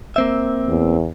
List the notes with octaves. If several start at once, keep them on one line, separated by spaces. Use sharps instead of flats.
A#3 C4 E5
E2